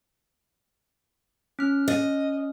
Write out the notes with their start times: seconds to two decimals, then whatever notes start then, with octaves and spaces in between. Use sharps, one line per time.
1.59 C#4 F6
1.88 D#5